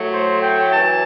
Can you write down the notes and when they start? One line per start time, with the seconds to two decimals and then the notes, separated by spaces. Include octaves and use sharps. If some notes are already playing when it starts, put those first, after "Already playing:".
Already playing: A2 F#3 A3
0.11 C5
0.42 G5
0.73 F#2 E3 A5